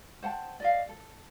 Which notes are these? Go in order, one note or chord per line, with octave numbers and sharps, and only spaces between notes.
C5 F#5 G5 A5
D5 D#5 F5
A4